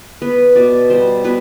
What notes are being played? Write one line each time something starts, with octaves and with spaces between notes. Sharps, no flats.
B3 B4
B2 D5
G3 C5
B2 B4